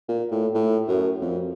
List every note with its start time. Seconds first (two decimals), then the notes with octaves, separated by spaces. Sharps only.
0.08 A#2
0.31 A2
0.55 A2
0.87 F#2
1.22 F2